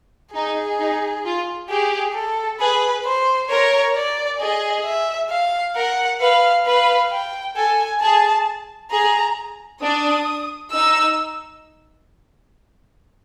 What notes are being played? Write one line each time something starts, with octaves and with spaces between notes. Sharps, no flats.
D#4 G#4
D#4
F4
G4 G#4
A4
G#4 B4
C5
A#4 C#5
D5
G#4 D#5
E5
F5
A#4 F#5
B4 F5
B4 F5
G5
A4 G#5
G#4 A5
G#4 A#5
D4 D#6
D#4 E6